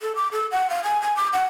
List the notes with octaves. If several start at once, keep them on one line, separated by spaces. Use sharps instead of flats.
A4
D6
A4
F#5
F5
G#5
G#5
D6
F#5